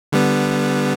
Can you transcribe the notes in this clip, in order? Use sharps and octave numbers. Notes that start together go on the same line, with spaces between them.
D3 G3 B3